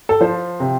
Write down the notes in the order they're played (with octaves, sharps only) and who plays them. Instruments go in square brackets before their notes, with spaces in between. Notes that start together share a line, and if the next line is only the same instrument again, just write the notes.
[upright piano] A4
F3 C5
C3